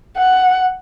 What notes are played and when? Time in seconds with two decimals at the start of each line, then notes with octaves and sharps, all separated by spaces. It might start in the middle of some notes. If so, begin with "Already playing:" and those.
0.17 F#5